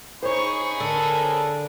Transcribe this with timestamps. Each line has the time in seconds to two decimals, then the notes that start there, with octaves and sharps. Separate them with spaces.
0.23 D#4 G#4 C5 C#5 B5 C#6
0.80 D3 A4 A#4